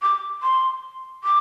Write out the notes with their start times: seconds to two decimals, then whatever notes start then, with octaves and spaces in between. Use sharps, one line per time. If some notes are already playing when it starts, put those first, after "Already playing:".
0.02 D6
0.43 C6
1.24 D6